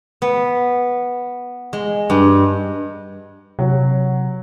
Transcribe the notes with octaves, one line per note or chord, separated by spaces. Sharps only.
B3
G#3
G2
C3 F#3